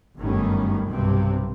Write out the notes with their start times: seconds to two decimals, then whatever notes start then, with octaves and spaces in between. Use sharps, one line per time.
0.17 G1 F#2 A2 D#3 G3 C#4
0.88 B1 G2 C3 C4